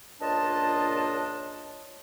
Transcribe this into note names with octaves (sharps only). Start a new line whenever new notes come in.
C#2 A#2 D4 F4 D#5 A5